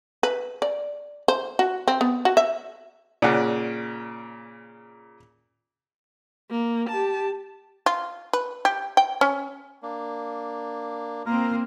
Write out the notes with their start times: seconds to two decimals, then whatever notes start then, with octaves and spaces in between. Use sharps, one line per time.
0.23 B4
0.62 D5
1.28 C5
1.59 F#4
1.88 C4
2.01 B3
2.25 F#4
2.37 E5
3.22 A#2 C#3 D5 F#5
6.51 A#3
6.89 G4 A5
7.86 F4
8.33 B4
8.65 G4
8.97 G5
9.21 C#4
9.83 A#3 D4
11.26 A#3 C4 F4 A#4 A#5